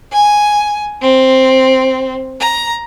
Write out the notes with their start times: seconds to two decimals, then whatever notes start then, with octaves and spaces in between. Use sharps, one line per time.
0.13 G#5
1.02 C4
2.40 A#5